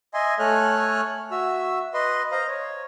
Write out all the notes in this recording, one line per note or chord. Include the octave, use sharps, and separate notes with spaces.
D#5 E5 G#5 C6
A3 A4 C#5 G#5 F6 F#6
F#4 E5 E6
B4 D#5 C6
C5 D#5 F5 A#5
C#5